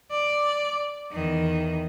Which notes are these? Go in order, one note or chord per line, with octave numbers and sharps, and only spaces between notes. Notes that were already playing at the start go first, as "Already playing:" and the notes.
D5
E2 D#3